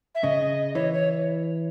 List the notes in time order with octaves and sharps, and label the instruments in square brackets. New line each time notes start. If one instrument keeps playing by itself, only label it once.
[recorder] E5
[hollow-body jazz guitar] C#3 [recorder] D#5
[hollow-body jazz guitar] E3 [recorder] C#5
[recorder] C#5